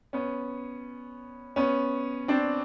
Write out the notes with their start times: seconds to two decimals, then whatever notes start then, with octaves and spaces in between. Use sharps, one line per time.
0.13 B3 C#4
1.56 B3 C#4
2.28 C4 D4